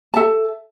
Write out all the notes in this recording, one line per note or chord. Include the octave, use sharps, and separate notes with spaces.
A4 E5 A5